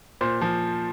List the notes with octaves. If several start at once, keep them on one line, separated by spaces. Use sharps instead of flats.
A#2 C5
F3